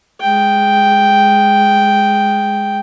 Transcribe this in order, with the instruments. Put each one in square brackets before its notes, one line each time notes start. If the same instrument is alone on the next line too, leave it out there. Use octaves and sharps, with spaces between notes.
[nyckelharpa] G#3 G5